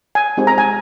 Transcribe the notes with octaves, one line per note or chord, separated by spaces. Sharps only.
G#5
G#3 C4 D#4 G4
A#5
G#5